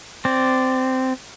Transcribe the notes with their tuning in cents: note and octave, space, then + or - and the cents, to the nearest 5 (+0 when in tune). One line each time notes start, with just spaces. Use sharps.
C4 -10 D5 +0